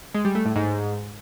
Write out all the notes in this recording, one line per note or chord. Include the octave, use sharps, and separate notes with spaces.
G#3
G3
A3
A2
G#2